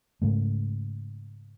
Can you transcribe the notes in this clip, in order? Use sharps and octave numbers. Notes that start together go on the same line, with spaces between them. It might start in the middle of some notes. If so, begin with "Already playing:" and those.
G#2 C#3 A3